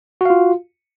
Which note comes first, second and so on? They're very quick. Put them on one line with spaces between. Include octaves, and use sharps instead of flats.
F#4 F5 F4